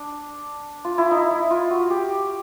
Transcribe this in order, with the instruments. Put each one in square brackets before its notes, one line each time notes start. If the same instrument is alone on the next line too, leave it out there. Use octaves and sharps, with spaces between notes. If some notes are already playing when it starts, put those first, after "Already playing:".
Already playing: [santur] D4
F4
E4
D#4
E4
F4
F#4
G4